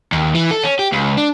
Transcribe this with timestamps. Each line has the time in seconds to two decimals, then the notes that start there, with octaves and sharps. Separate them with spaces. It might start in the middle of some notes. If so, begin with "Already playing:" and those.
0.12 D#2
0.35 E3
0.51 A4
0.63 C#4
0.79 G4
0.92 C#2
1.17 D4